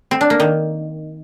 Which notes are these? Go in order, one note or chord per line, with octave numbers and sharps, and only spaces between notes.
C4
D4
A#3
D#3